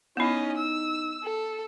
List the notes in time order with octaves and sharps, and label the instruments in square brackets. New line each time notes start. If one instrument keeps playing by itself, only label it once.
[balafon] B3 E4 [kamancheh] C#4 D#5 [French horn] D#4
[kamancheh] E6
A4